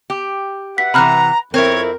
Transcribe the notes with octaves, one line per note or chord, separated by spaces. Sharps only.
G4
B4 E5 F#5 B6
C3 E3 A#5 B5 F6 F#6
F2 C4 E4 A#4 C#5